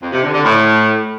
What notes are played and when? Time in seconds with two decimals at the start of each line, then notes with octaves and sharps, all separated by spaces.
0.02 F2
0.13 C3
0.23 D3
0.34 D3
0.44 A2